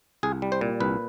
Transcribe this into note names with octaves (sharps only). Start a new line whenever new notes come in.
C2 G#4
G3
C5
A#2
C2 B4